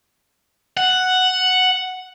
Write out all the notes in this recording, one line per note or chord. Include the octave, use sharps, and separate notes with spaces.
F#5